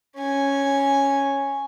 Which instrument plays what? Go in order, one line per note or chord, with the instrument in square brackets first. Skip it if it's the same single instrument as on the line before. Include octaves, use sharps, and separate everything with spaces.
[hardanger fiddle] C#4 G#5